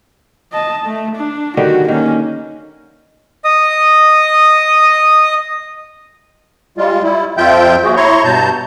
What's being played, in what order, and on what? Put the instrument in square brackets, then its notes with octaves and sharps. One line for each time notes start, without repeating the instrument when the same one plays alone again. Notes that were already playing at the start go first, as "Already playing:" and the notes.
[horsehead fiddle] D#5 A5
A3
D4
[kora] D3 D#3 G3 [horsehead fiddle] F#4
[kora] D#3 [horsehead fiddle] A#3 C#4
[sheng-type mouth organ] D#5 D#6
[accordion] G3 G#3 F4
G3 E4
F2 F3 F4 E5 G5 G6
D#2 F#4 G#4
E4 C#5 A#5 C6 C#6
G2 B2 A5 A#5 G6